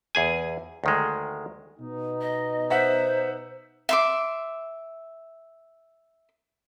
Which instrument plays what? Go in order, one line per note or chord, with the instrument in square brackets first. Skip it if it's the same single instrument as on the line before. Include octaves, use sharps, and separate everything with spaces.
[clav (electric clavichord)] E2 G#4 G#5
D2 D#3 G#3
[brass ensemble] B2 B3 D#4
[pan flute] D#5
[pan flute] C5 [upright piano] E5 F#5 B6
[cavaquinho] E5 C6 D6